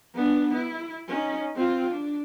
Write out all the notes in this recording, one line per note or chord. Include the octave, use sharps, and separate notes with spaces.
B3 D4
E4
C#4 D#4
C4 F4
D4